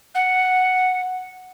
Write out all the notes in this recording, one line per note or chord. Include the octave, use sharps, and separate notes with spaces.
F#5